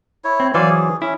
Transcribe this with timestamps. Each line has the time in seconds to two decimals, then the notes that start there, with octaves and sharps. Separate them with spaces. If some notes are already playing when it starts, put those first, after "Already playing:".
0.24 E4 C#5
0.40 C4
0.54 E3 F#3 C5 D5 F5 G#5
0.70 G#4
1.02 C#4 E4